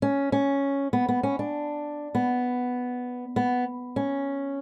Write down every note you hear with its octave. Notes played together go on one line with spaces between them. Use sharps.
C#4
C#4
B3
B3
C#4
D4
B3
B3
C#4